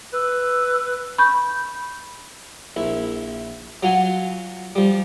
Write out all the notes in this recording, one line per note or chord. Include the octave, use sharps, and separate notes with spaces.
B4 E6
B5 C#6 G6
A#1 E4
F#3 F4 F#5 G#5
F3 G3